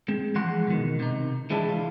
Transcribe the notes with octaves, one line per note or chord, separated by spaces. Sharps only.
G#3 C4
E3 F3 G#3 F#5 C6
B2 D#3
C3 D#4
E3 G#3 C4 D4 E4
F4